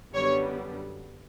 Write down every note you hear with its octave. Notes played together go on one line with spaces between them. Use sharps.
F#2 D3 G3 B3 C#5